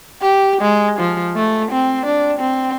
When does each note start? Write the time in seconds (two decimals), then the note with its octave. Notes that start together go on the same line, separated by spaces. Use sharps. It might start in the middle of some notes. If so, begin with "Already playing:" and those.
0.22 G4
0.62 G#3
0.99 F3
1.36 A3
1.71 C4
2.06 D4
2.39 C4